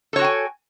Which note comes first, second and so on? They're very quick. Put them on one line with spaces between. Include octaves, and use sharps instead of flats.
A4 C#5 F#4 G5 G#5